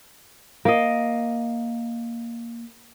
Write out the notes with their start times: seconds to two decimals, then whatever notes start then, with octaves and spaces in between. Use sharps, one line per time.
0.65 A#3 D#5